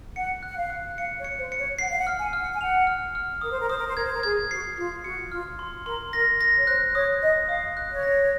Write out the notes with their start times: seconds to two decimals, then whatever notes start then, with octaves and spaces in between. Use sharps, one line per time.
0.16 F#5 C#7
0.43 F#5 F#6
0.57 F5
0.70 F#6
0.97 F5 C#7
1.18 C#5
1.24 C#7
1.38 C5
1.52 C#7
1.59 C#5
1.79 F#5 C7
1.89 F5
1.99 F#5
2.07 F6
2.19 G#5
2.33 F6
2.40 F#5
2.53 G#5
2.61 F#5 F7
2.87 F6
3.15 F6
3.41 A#4 D#6
3.51 C5
3.59 A#4
3.69 C5 D#6
3.78 A#4
3.86 C5
3.95 A#4 G#6
4.04 C5
4.14 A#4
4.23 G#4 G#6
4.50 F#4 C7
4.77 F4 C7
5.04 F#4 C#7
5.32 F4 F6
5.59 C6
5.86 A#4 C6
6.13 A#4 A#6
6.41 A#6
6.56 C#5
6.67 C5 F#6
6.95 C#5 D#6
7.22 D#5 A#6
7.49 F5 D#6
7.77 F#6
7.90 C#5
8.03 A#6